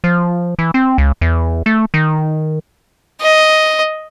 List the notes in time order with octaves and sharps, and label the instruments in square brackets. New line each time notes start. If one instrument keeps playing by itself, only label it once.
[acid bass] F3
E3
C4
C#2
E2
A3
D#3
[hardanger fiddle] D#5